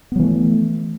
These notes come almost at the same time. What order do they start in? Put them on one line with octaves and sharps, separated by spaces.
B3 F#3 E3 A3